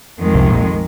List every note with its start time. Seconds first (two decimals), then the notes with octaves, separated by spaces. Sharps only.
0.20 F2 D#3 G#3
0.34 C2 C3
0.50 A#1 A#2